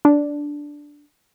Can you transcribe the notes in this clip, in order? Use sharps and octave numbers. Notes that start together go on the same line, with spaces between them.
D4